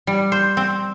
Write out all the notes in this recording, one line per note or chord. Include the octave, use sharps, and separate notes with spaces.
G3
C5
C4